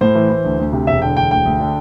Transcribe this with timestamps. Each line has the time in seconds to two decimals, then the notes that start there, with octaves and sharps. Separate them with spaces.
0.01 A2 C5
0.15 E3
0.30 E3
0.44 D2
0.59 D2
0.73 C3
0.87 E1 E5
1.02 D3 G5
1.17 E1 G5
1.31 D2 G5
1.46 D2
1.60 D3